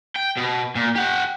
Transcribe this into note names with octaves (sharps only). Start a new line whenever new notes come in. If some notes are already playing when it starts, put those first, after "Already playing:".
G5
B2
A#2
G4 F#5